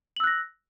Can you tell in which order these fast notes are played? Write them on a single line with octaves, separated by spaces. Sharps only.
F#7 E6 F#6 A#6